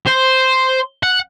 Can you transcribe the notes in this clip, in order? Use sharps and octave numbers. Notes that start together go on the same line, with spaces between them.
C5
F#5